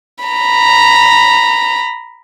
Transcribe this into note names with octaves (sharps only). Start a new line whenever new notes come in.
A#5 B5